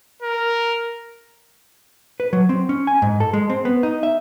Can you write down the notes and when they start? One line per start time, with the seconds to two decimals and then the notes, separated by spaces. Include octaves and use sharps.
0.23 A#4
2.20 B4
2.33 F#3
2.49 C4
2.69 C#4
2.87 G#5
3.02 G#2
3.20 A4
3.33 G#3
3.50 C4
3.65 B3
3.83 D#4
4.03 E5